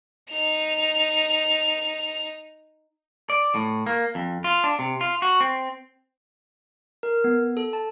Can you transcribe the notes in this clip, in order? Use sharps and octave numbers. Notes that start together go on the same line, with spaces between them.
D#4 F7
D5
A2
A#3
F2
F4
D4
C3
F4
F#4
C4
A#4
B3
A4
A5